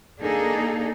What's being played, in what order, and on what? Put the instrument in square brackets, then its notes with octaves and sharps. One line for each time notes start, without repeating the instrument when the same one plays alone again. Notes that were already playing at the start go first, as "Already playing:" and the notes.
[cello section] A#3 D4 D#4 G#4 A4